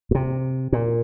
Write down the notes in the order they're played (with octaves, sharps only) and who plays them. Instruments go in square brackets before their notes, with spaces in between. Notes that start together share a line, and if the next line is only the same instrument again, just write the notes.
[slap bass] A#2
C3
A#2